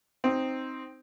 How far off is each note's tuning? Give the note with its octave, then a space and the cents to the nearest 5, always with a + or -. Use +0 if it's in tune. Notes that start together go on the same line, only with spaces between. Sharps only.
C4 +0 D#4 +0